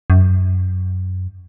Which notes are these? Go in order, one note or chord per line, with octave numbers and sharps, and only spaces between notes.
F#2